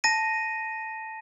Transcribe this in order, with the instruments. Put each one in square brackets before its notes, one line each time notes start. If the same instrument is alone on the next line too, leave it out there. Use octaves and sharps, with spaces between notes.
[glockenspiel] A5 A#6 D#7